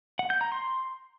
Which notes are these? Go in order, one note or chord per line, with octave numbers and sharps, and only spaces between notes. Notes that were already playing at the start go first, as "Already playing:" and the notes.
F#5
G6
A#5
C6